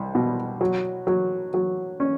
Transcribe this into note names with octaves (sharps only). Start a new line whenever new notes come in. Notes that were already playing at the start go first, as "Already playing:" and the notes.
Already playing: C2
B2
F#3
F#3
F#3
C#4